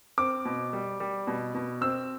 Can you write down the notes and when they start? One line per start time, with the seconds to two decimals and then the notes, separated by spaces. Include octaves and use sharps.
0.18 C4 D6
0.45 B2
0.73 G3
1.00 G3
1.27 B2
1.55 B2
1.81 C4 E6